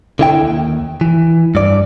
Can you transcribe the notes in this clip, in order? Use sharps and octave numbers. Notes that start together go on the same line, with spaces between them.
D3 E4 G5
D#2
E3
G2 D5